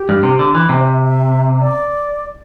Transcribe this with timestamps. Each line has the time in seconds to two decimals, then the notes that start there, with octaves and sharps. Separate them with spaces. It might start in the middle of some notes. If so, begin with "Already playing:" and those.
Already playing: G4
0.09 G2
0.23 C3
0.39 D3
0.55 E3
0.69 C3 C5
0.81 E5
0.92 E5
1.03 E5
1.61 D5